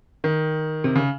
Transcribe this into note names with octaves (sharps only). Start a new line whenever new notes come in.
D#3
C3
C#3